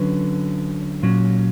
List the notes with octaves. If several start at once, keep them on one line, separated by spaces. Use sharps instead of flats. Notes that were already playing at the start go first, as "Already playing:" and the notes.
Already playing: D3 F#3 C#4 B4
A#2 F#3 C#4